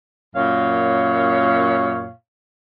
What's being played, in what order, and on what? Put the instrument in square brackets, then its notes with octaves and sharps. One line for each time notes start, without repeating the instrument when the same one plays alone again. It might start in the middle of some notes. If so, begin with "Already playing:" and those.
[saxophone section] F#2 A#2 C#5 F5